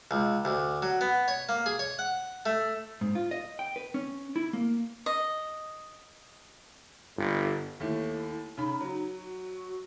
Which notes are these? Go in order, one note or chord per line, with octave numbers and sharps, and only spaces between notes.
C#2
D2
F#3
B3
C#5
A#3
G#4
C#5
F#5
A3
G#2
F4
D#5
G5
B4
C#4
E4
A#3
D#5
G1
D#2 A3 E4
C#3 D#4 B5
F#3
F#4